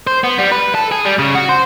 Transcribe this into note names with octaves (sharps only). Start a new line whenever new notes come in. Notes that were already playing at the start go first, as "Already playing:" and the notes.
C5
B3
G3
B4
A4
G#4
G3
C#3
F#4
C5